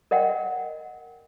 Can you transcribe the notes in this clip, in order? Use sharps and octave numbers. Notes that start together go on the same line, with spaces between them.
A#4 D#5 F#5 G5